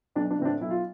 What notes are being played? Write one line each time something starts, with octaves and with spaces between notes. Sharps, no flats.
B1 D4
D4
A2 E3 C4
D4
B1 E4
F4